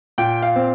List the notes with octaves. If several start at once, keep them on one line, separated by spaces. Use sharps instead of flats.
A#2 G5
F5
C4